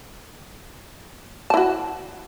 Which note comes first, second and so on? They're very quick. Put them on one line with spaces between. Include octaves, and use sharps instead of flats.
A5 E4 F#4